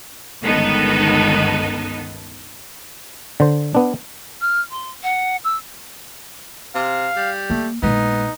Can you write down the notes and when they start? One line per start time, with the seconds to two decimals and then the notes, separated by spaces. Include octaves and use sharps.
0.44 G1 C#2 D#3 B3 D#4 A4
3.40 D3 C5
3.75 B3 D4
4.41 F6
4.71 C6
5.03 F#5
5.44 E6
6.75 C3 F5
7.16 G3
7.50 A3 A#3
7.83 A#1 G#3 B3 D#4